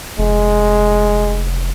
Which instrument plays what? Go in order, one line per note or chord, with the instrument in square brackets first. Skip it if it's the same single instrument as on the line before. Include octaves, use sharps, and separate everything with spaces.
[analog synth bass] F1 [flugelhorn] G#3